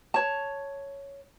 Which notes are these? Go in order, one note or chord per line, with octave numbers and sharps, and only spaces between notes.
C#5 A5